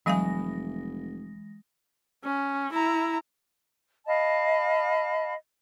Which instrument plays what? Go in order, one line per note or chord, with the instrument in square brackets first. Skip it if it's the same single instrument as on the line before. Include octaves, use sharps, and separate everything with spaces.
[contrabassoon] F1 [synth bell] E3 G#3 A#6 [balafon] F#3 F5 G#5
[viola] C#4
E4 A#5
[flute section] D#5 F5 A5 B5